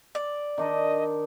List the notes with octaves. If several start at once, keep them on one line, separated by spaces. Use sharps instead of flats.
D5
D#3 D4 D#4 D#5